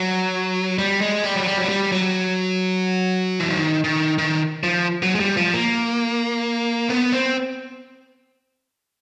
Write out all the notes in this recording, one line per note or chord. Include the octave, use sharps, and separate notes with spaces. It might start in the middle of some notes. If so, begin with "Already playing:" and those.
Already playing: F#3
G3
G#3
G3
F#3
G3
F#3
G3
F#3
E3
D#3
D#3
D#3
F3
F#3
G#3
G3
F3
A#3
B3
C4